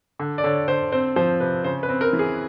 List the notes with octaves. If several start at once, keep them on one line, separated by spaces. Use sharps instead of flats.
D3
D5
D3 C#5
D3 C5
C4 C5
F3 C5
C3 B4
C#3 C5
B4
C4
A#4
E3
G#4